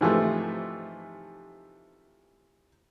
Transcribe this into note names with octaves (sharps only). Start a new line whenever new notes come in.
G#2 C3 E3 F3 G3 A3